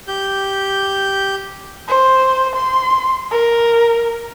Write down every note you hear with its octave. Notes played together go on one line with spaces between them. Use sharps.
G4 G6
C5
C6
A#4